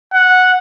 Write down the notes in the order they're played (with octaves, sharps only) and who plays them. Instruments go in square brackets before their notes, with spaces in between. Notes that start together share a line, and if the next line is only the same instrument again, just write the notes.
[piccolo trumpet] F#5